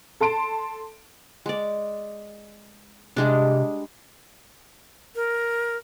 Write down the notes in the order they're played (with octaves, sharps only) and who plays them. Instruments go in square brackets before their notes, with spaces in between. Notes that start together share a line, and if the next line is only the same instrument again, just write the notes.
[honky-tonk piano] A4 A5 C6 D7
[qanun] G#3 D5
[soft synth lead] C3 [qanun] G3 G#3 D4
[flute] A#4